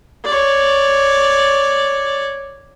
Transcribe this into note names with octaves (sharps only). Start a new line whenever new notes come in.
C#5 D5